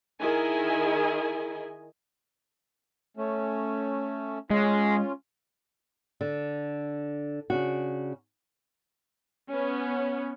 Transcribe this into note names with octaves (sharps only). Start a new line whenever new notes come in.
D#3 E4 G#4 D#5 G#5
A3 C#4
G#3 C#4 F4
D3
C#3 D4 F#4
B3 C#4